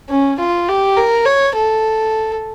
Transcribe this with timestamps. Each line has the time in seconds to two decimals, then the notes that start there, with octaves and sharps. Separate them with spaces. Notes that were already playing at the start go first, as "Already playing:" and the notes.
0.10 C#4
0.39 F4
0.68 G4
0.97 A#4
1.25 C#5
1.55 A4